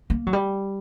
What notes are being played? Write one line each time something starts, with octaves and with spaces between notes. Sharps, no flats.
A#3
F#3
G3